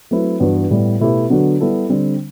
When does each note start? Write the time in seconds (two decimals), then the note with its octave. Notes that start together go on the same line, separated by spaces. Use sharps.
0.11 F#3 A3 C4 E4 B4
0.40 G2 E3 B3 F#4
0.70 A2 G3 B3
1.00 B2 A3 E4 G4 B4
1.30 D3 F#3 B3 F#4
1.61 G3 B3 E4 A4
1.89 D3 G3 C4